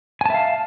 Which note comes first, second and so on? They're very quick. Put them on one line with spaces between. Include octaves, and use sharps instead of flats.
G#5 A5 E5 F5